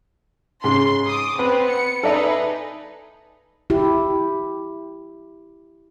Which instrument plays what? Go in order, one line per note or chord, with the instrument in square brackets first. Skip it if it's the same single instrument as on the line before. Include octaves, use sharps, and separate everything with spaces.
[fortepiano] G#2 C#3 [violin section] C6
[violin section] D6 D#6
[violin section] B3 C4 [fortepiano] B4
[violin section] C#7
[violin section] D#4 G#4 B4 [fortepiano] A4 D5 E5
[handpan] E4 G4